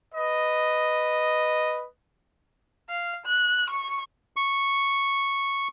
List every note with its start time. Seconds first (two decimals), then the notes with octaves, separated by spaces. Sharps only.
0.14 B4 D#5
2.89 F5
3.26 F#6
3.70 C#6
4.36 C#6